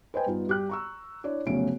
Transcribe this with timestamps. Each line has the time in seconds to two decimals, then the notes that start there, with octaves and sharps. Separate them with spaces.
0.14 B4 C5 D#5 G5 G#5
0.26 G2 B3 D#4 F4
0.47 G2 G4 F#6
0.69 A#5 C#6 E6
1.24 D4 E4 C#5 D5
1.46 F1 B1 C#3 A3 C#4 D7